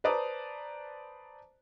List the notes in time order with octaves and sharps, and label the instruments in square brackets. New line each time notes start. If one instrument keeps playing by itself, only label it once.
[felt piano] B4 C5 D5 A5 A#5 D#6